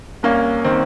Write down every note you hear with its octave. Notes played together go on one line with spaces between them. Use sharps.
C2 A#3 C#4
D#3 C4